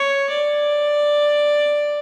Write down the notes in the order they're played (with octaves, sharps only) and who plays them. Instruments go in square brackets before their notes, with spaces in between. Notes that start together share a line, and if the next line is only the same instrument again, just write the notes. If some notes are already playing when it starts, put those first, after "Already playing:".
Already playing: [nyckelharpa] C#5
D5